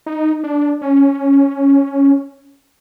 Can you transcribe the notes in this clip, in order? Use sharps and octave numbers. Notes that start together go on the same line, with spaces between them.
D#4
D4
C#4